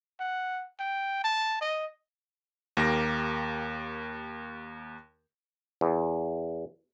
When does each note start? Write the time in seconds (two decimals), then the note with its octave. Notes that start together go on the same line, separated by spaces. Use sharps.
0.20 F#5
0.80 G5
1.24 A5
1.61 D#5
2.77 D#2 A#3 G4 A#6
5.81 E2